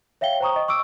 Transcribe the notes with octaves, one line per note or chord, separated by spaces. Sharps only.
C#5 E5 F5 G5 G7
C5 G5 A#5 C#6 D#6
D#5
C#6 D6 E6 D7